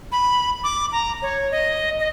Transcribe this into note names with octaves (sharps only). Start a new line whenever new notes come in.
B5
D6
A#5
C#5
D#5
D#5